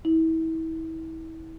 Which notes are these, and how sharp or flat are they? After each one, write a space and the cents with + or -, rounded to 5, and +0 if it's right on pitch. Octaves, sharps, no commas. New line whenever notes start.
E4 -35